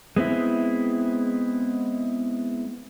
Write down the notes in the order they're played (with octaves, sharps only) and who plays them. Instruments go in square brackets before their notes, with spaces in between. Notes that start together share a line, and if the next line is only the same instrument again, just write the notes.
[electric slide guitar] G#3 B3 C4 E4